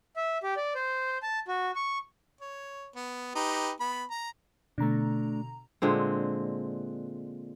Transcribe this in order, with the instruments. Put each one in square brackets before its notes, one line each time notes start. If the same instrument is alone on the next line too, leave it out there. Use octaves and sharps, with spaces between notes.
[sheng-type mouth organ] E5
G4
D5
C5
A5
F#4
C#6
[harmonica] C#5
B3
D#4 G4 B4
B3 B5
A#5
[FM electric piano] B2 D3 A#5 [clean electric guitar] A3 D4
[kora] A#2 D3 G#3 C4